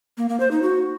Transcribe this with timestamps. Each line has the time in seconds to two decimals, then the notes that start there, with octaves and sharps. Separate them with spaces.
0.18 A#3
0.29 A#3
0.40 C5
0.51 D#4
0.62 F#4